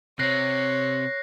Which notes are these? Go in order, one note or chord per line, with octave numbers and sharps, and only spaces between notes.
C3 C4 C#5 F#6 A#6 C7